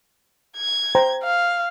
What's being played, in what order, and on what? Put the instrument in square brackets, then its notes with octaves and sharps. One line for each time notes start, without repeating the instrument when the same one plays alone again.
[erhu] G#6
[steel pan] C5 G5 A#5
[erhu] F5